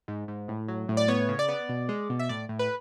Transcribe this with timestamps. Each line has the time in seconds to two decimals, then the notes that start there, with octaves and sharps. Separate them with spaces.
0.08 G#2
0.28 G#2
0.48 A2
0.68 F#3
0.89 A2
0.97 D5
1.08 B3 C#5
1.29 C#3
1.39 D5
1.49 B3
1.69 B2
1.89 G#3
2.10 B2
2.19 E5
2.29 A2 D5
2.49 A2
2.59 B4